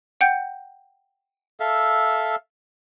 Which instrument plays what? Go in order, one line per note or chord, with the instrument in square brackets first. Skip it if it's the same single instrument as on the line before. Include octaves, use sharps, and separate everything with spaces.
[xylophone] F#5 G5 G6
[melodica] A4 E5 F5